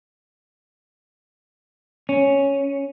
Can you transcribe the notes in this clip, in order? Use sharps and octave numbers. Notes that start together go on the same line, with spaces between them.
C#4